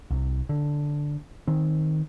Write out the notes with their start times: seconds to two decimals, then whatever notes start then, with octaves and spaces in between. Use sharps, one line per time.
0.11 C2
0.49 D3
1.47 D#3 C4